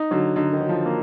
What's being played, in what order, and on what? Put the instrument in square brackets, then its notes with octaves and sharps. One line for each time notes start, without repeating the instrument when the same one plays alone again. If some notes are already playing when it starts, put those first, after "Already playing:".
Already playing: [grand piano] D#4
[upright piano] D3 [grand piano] F#3
[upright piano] D3 [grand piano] D#4
[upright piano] D#3
[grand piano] F#3
[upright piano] F3
[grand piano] A#3